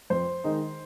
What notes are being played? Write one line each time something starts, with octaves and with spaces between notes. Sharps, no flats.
F2 C5
D#3 G#3 D#4